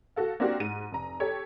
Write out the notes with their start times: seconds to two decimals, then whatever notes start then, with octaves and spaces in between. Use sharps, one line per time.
0.16 F#4 A4 F5
0.40 A#3 C4 D4 F#4 G4
0.60 G#2 D#7
0.92 F1 A#5
1.20 G4 A4 C#5